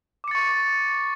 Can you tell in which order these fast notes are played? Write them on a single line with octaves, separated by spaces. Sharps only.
D6 C#7 A6 C#6